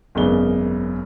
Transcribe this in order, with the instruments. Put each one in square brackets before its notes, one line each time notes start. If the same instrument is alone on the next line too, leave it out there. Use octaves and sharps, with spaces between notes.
[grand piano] G#1 F#2 C#3 B3 D5 G7